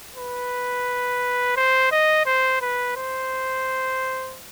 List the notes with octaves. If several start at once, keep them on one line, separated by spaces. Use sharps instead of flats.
B4
C5
D#5
C5
B4
C5